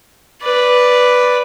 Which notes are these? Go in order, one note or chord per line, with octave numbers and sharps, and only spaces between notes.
B4 D5